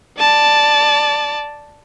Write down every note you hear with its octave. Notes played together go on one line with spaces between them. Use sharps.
D5 A5